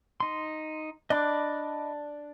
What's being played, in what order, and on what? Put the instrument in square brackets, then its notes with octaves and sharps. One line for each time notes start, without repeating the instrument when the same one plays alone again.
[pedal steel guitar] D#4 C6
[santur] D4 [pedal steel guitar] D#5 B5 D6